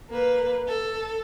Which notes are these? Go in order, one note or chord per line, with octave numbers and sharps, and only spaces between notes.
A#3 B4
A4